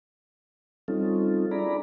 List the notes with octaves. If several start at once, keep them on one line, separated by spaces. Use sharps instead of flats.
G3 C4 C#4 D#4 F4 A4
D4 E4 G#4 D5 A#5 B5